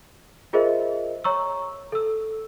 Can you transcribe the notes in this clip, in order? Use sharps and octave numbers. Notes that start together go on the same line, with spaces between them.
F4 G#4 A#4 C5 D#5 E5
C#5 A#5 C#6 E6
A4 E6